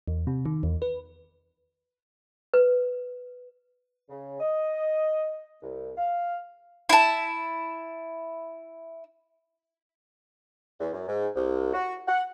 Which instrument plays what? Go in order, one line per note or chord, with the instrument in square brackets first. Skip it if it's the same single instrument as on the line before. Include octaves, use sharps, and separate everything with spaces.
[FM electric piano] E2
C3
D#3
E2
B4
[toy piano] B4
[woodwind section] C#3
D#5
C2
F5
[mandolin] E4 A5
[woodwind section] E2
F#2
G#2
C2
F#4
F#5